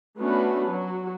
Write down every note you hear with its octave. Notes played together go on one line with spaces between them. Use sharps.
A3 B3 C#4 D4 F#4 B4
F#3 F#4